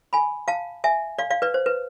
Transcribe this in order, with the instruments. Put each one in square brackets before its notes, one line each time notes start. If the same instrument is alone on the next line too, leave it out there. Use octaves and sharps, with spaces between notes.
[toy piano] G#5 B5
F5 A5
E5 G#5
D5 F5
D5 F5
B4 D5
C5
B4